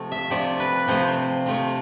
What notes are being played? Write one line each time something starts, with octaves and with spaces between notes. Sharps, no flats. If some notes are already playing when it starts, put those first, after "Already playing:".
Already playing: C3 F3 A3
E5
C3 F3 A3 D5
B4
C3 F3 A3 C5
C3 F3 A3